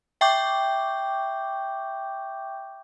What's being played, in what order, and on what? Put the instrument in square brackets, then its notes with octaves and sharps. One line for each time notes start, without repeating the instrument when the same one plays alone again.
[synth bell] E5 G5 C#6 D6 G6